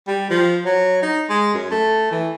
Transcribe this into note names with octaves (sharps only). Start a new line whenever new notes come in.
G3
F3
F#3
D#4
G#3
F#2
A3
E3